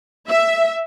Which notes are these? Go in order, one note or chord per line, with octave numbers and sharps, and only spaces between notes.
E5